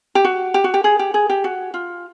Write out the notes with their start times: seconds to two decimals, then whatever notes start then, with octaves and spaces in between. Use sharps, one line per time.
0.15 G4
0.25 F#4
0.54 G4
0.64 F#4
0.74 G4
0.84 G#4
0.99 G4
1.14 G#4
1.29 G4
1.44 F#4
1.74 F4